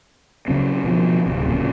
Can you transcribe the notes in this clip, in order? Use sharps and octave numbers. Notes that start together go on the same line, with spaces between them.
C#3 F#3 C4
B2 F3
D1 A#1 C3
A#2 C#3